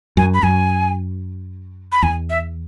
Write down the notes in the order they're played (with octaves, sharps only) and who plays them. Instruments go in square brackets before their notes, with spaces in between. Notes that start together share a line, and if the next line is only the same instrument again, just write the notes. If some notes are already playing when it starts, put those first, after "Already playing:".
[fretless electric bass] F#2 [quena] G#5
[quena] B5
[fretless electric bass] F#2 [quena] G#5
[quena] B5
[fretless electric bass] E2 [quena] G#5
[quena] E5